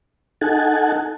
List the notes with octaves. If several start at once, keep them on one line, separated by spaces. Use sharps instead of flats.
D#4 A4 F#5 G#5 A5